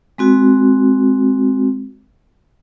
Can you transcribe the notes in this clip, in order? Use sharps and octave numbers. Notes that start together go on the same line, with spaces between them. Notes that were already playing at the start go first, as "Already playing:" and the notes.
G#3 C4 F#4